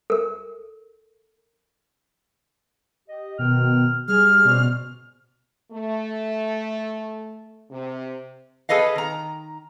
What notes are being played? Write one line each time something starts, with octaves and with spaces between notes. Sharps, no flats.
A4 A#4
G4 D#5
B2 D#3 G5 F6
G3 G#4 F6
B2 C#4 C5 D5
A3
C3
G#4 A4 B4 D#5 F5
D#3 A#5